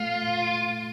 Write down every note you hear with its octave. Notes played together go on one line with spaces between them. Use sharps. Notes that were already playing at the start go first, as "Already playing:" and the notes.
Already playing: A3 F4